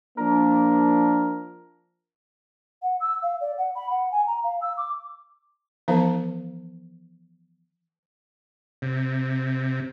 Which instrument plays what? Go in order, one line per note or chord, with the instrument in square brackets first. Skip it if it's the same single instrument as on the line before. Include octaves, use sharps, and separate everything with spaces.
[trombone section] F3 A#3 D4 [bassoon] A#4
[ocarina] F#5
E6
F5
D5
F#5
B5
F#5
G#5
A#5
F5
E6
D6
[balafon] E3 F3 B3 D#4 C5 F5
[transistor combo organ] C3